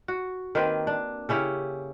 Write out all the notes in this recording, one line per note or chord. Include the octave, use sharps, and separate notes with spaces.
F#4
D#3 A#3 C4 B4
D4
C#3 C#4 E4 G4